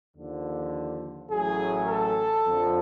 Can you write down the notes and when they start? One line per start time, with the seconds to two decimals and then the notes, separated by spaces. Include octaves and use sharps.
0.15 D#2 D3 F3
1.30 A1 A2 F#3 G#4
1.88 A4
2.47 F2 D3 F3